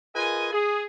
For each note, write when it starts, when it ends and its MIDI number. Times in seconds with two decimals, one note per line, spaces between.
0.16 0.51 65
0.16 0.51 68
0.16 0.51 70
0.16 0.51 71
0.16 0.51 75
0.16 0.51 80
0.53 0.85 68